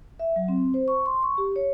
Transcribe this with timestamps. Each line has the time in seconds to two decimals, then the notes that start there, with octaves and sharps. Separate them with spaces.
0.19 E5
0.36 F#3
0.48 C4
0.74 C5
0.88 C#6
1.06 C6
1.23 C#6
1.38 G4
1.56 C#5